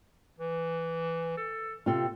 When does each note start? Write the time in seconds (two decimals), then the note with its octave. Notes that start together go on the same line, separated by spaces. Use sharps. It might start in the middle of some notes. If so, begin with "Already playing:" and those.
0.38 E3
1.37 A4
1.86 C3 C4 F4 A4